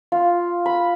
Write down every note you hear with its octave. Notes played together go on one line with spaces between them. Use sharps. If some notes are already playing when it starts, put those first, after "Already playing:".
F4
B5